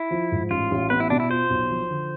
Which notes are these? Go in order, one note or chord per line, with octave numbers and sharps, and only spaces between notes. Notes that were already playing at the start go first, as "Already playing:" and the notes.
Already playing: E4
F3
G#2
A1 F4
A1
B3 B4
E4
B2 D4
E4
F4 C5
B1
F3
D3